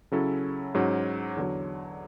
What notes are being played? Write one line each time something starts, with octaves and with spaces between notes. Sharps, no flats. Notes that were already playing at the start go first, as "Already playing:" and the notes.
C#3 F#3 C#4 E4 A4
G#2 F#3 C#4
E2 D3 F#3